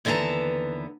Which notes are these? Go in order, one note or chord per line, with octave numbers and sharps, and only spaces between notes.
D#2 D3 E3 B3 A5 A#5